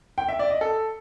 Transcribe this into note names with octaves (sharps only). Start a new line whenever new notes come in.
G5
E5
D5
D#5
A4